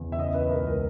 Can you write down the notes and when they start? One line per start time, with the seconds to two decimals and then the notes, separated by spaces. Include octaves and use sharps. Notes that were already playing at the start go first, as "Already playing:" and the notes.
Already playing: E2 C#3
0.12 E5
0.19 C#4 D#5
0.34 B4
0.51 C#2 A#4
0.66 A#4